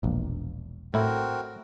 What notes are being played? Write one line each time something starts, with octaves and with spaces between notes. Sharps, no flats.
E1 A#1
A2 C4 E4 F#4 A#4